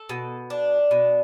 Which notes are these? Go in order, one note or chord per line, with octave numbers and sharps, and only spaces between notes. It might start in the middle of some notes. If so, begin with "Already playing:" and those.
Already playing: A4
B2
D4
B2